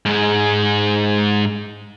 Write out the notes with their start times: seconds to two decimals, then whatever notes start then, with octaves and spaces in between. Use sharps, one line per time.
0.06 G#2 G#3